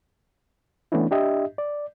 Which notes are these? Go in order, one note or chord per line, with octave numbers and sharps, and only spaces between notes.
E3 A3 B3 C#4 D4 E4
D4 G4 D#5 E5
D5